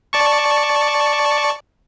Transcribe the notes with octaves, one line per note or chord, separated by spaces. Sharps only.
D5 A5 C#6